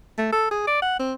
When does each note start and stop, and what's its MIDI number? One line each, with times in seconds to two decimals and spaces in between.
0.18 0.30 57
0.33 0.50 69
0.51 0.63 68
0.67 0.80 74
0.82 0.99 78
1.00 1.14 60